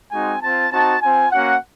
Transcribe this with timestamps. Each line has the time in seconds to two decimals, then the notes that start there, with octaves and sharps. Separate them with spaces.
0.12 G#3 C4 D#4 F#4 G#5
0.42 C4 F4 A5
0.72 C4 D#4 F#4 A5
1.02 C4 F4 G#5
1.31 A#3 C#4 F#4 F#5